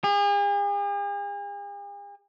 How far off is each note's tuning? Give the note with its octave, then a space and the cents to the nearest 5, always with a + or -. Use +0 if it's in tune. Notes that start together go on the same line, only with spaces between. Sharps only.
G#4 -45